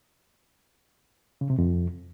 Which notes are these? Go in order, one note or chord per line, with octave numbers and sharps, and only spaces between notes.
C#3
C3
F2